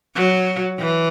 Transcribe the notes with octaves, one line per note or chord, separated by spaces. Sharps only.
F#3
E3